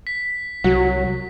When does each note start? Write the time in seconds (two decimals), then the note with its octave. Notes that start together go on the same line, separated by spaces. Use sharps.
0.07 B6
0.64 C2 F#3 F#4